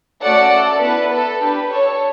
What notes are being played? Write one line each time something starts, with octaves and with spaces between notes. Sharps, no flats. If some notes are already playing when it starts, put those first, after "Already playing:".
A3 C#4 F#4 A4 D5 F#5
A4
B3 E4 A4 B4
A4
D4 G4 B4
A4 C#5